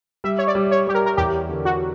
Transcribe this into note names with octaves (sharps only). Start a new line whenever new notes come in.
G3 E5
C#5
D5
G3
C#5
G3 G4
A#4
A#4
E2 G4
D3
F#4